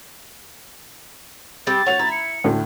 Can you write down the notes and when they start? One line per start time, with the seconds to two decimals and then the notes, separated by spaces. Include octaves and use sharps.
1.67 G3 C4 A6
1.86 C#5 F#5 F7
1.99 E4 A#5
2.12 C#7
2.44 D2 A2